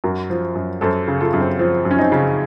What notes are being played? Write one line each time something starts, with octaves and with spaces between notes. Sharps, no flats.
F#2 F#4 A#4
F3
F#2
F#2 A4 C5
C#3
F4 A4
F#2
C4
F3
F#2
C#4
C4 D#4
C#3